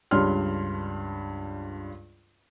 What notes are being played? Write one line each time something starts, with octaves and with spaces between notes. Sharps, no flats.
C#2 G2 D4 C#5 C6 F6